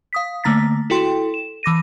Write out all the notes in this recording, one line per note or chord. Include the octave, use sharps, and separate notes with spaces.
F5 D#6 B6
D3 A3 A#3 A#5 A6 B6
E4 F#4 A4 G5 C6
E7
E3 D6 A#6 D#7